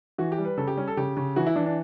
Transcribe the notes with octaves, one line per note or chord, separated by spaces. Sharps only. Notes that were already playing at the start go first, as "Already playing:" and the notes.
E3 F#4
G4
G3
B4
C#3 A4
G4
G3 C#4
A4
C#3 G4
C#3
E3 F#4
E4
E3 D4
D4